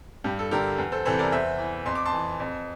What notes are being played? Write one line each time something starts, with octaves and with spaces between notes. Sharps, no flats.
G2 G4
A4
D3 G4 A#4
E2
A4 C5
C3 E3 A4 C5
A#4 D5
E2 C5 E5
E3
F2 C6
D6
A5 C6
E3
F2